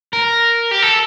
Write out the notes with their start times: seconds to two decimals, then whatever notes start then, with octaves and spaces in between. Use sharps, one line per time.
0.13 A#4
0.71 G4
0.82 A4